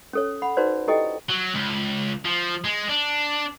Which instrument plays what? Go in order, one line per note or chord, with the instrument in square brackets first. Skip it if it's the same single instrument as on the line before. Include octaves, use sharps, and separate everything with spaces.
[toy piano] C#4 A4 C#5
F#5 B5
D#4 F#4 B4 C5 D5
E4 G4 A4 D#5 G5
[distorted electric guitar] F#3
C#2
F3
G#3
D4